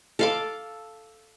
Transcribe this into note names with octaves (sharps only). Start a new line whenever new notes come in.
A4 F5 D6